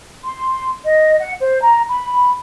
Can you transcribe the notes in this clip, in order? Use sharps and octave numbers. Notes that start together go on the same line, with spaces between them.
C6
D#5
F#5
C5
A#5
B5